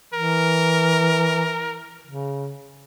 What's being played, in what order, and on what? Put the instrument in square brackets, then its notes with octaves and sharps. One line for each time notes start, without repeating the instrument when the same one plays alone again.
[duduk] E3 [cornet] A#4
[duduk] C#3